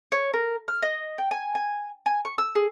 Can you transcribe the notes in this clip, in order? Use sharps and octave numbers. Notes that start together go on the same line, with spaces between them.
C#5
A#4
F6
D#5
G5
G#5
G#5
G#5
C#6
E6
G#4